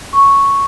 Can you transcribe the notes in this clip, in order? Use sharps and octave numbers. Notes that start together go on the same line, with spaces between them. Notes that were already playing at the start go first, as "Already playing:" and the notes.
C#6